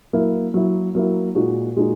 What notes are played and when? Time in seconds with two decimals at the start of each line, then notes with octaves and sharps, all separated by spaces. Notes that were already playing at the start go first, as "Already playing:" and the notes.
0.13 F#3 A#3 E4
0.54 F#3 A#3 E4
0.95 F#3 A#3 E4
1.35 A#2 G#3 D#4 F#4
1.76 A#2 G#3 D#4 F#4